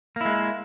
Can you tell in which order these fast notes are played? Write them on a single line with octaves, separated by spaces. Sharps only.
A#3 E4 G#3